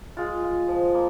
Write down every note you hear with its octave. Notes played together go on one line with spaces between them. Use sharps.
G#3 F4
F4
F3
A#3